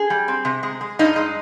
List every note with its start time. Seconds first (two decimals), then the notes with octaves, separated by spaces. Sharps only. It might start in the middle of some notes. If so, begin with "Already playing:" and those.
Already playing: G#4
0.10 G3
0.28 C4
0.45 C3
0.63 G#3
0.81 G#3
0.99 G2 D#4
1.16 G#3